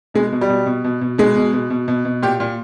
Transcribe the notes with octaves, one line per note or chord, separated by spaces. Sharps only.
B2 G#3
B2
G3
B2
B2
B2
B2
B2 G#3
B2
B2
B2
B2
B2
A#2 G4
A#2